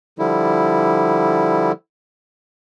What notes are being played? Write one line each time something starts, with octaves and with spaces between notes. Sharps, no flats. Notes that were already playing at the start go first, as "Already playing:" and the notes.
D3 F3 G3 E4